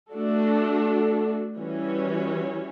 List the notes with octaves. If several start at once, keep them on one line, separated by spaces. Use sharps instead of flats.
A3 D4 F#4 A4
E3 G3 C#4 F#4 C#5